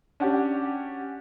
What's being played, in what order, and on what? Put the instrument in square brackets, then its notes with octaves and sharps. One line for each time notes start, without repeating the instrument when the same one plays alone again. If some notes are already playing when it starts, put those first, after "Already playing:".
[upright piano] C#4 D4 F#4 G4